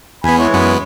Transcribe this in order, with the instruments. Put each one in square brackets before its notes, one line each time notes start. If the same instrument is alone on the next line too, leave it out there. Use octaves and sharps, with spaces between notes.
[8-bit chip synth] E2 B3 [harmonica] G#5 B5
[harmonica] E3 G#3 C#5
[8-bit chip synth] F#2 B3